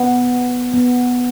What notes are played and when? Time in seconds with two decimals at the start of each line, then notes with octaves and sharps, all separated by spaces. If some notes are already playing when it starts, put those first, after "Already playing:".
Already playing: B3
0.74 B3